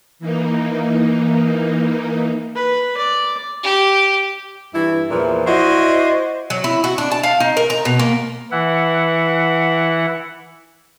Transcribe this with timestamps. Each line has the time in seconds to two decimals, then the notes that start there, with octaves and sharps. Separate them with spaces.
0.19 E3 A#3 D#4
2.56 B4
2.98 D5
3.63 G4
4.75 G2 E3 E4
5.11 E2 A#2 E3 F3
5.47 E4 F#4 C5 D5 D#5
6.50 F#3
6.64 E4
6.84 F#4
6.98 D4
7.11 A5
7.23 F5
7.40 D#4
7.57 A#4
7.70 A#5
7.85 B2
7.99 A#3
8.51 E3 E4 F#5